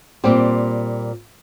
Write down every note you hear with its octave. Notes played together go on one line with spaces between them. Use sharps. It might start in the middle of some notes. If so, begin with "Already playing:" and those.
A#2 G3 C4